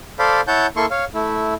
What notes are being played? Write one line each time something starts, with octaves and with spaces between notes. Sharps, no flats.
A4 C5 D5 F5 B5
E4 C#5 F#5 A5 G6
A#3 E4 A4 C6 C#6
C#5 F5
A3 E4